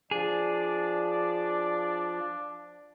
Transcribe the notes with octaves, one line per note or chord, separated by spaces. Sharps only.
F3 D4 G#4 D5